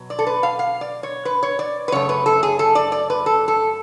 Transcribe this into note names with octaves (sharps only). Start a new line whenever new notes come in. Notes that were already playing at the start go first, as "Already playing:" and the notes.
Already playing: B2 F#3
D5
A4
B4
F5
F5
D5
C#5
B4
C#5
D5
B4
F#2 C#3 A3 C#5
B4
A4
G#4
A4
D5
D5
B4
A4
A4